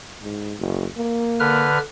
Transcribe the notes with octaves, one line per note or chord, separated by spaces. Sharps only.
G#2
F#1
A#3
D3 B4 F6